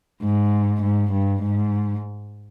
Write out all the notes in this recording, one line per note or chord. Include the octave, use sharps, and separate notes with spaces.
G#2
G#2
G2
G#2